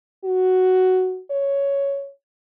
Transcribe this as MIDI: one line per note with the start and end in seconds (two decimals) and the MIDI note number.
0.24 1.20 66
1.30 2.10 73